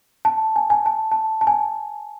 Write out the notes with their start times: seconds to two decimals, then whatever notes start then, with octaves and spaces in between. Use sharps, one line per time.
0.25 A5
0.56 G#5
0.70 G#5
0.86 A5
1.12 A5
1.41 A5
1.47 G#5